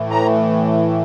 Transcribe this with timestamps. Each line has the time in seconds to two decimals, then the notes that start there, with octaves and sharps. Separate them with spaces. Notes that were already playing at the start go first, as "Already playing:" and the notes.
Already playing: A2 E3 A3
0.11 A#5